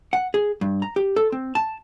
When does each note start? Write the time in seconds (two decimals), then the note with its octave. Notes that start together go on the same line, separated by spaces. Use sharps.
0.13 F#5
0.34 G#4
0.61 G2
0.82 A#5
0.96 G4
1.16 A4
1.32 C4
1.55 A5